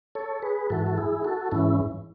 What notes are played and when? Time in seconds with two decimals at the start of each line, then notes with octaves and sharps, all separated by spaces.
0.15 A4 C#5
0.42 G#4 B4
0.70 G#2 E3 F#4 A4
0.86 A4
0.97 E4 G#4
1.24 F#4 A4
1.52 G#2 E3 C#4 E4